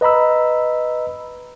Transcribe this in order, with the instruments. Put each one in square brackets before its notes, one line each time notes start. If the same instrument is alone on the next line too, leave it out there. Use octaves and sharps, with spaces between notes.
[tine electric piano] B4 D#5 A#5 B5 E6